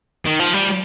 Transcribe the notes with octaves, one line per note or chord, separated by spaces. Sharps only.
D#3
F3
G3